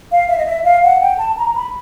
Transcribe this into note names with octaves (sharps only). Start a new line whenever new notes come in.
F5
E5
D#5
E5
F5
F#5
G5
A5
A#5
B5